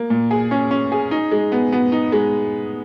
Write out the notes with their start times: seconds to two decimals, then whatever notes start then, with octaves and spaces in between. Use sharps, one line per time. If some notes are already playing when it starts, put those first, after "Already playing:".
Already playing: A#3
0.10 A#2
0.31 G#4
0.51 C#4
0.71 C#4
0.92 G#4
1.11 D#4
1.31 G#3
1.52 B3
1.72 B3
1.92 D#4
2.12 G#3